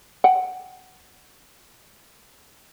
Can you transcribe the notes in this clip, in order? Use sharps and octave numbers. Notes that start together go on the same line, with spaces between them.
F#5 G5